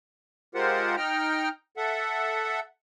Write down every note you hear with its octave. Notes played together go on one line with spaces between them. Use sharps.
G#3 F4 G4 A#4 C5 F#5
D#4 G5 A#5 F6
A4 E5 F#5